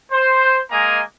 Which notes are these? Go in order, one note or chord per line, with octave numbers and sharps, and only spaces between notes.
C5
G#3 A#3 D#5 G#5 A#5